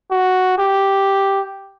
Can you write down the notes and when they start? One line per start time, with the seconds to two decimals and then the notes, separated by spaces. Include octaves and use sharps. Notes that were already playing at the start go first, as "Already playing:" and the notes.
0.11 F#4
0.58 G4